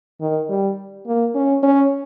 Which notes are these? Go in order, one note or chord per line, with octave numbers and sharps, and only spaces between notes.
D#3
G3
A#3
C#4
C#4